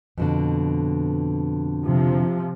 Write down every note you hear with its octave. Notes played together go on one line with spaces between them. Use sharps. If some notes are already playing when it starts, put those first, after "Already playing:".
F2 B2 D3
C3 F3